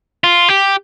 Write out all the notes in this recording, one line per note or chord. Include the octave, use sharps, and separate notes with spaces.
F4
G4